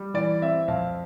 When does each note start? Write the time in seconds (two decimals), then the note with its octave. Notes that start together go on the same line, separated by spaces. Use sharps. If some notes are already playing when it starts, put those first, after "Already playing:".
Already playing: G3
0.14 E3 D5
0.42 C4 E5
0.68 F2 F5